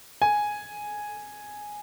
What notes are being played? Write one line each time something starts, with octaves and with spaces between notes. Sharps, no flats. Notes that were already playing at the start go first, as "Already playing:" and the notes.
G#5